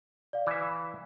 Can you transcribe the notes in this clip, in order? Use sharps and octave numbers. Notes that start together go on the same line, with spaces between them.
D5 F5
E3 E5